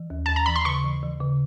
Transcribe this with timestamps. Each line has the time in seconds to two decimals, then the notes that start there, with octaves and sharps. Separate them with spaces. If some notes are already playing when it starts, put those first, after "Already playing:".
Already playing: E3
0.10 D#2
0.26 D#2 A5
0.36 A#5
0.46 E3 B5
0.56 C6
0.65 C#3 C#6
0.84 E3
1.03 E3
1.21 C#3